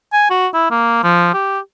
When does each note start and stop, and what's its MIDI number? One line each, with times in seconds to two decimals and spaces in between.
0.13 0.26 80
0.30 0.47 66
0.54 0.68 64
0.71 1.03 58
1.04 1.30 53
1.33 1.59 67